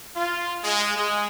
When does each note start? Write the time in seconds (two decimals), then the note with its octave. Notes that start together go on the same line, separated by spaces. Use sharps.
0.16 F4
0.64 G#3
0.95 G#3